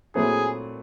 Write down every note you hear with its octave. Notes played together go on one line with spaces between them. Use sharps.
A#2 F#3 A3 C4 E4 G#4